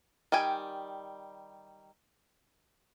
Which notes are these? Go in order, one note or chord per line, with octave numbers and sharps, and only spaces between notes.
D#3 G3 G5 G#5